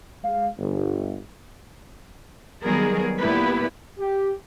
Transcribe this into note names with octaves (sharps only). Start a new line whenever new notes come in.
G#3 F5
G1
D#3 F#3 G3 B3 G#4 A#4
A#2 B3 E4 G4 B4
G4